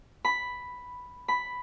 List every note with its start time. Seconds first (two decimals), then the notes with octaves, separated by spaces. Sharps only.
0.25 B5
1.28 B5